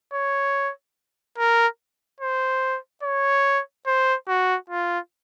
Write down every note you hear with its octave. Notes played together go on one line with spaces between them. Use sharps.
C#5
A#4
C5
C#5
C5
F#4
F4